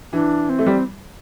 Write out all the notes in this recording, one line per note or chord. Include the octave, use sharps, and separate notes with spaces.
E3 D4
C4
A3
G3